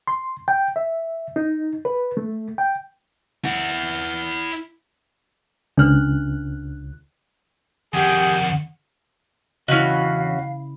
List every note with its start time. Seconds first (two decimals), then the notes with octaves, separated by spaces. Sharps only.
0.07 C6
0.48 G5
0.76 E5
1.36 D#4
1.85 B4
2.17 A3
2.58 G5
3.45 E4 F#5
5.77 C#2 D4 F6 F#6
7.94 F2 D#3 G4 G#4 F#5
9.68 E2 C#3 C#4 E4 F#4 D#5 F5